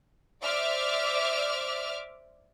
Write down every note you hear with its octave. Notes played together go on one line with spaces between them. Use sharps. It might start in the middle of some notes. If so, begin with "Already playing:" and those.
C5 D5 E5 D6 F6